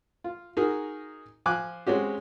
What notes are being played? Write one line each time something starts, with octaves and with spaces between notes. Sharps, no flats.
F4
D#4 F#4 G#4 A#4
F3 G#5 D6 F#6
G#3 C4 C#4 F#4 G4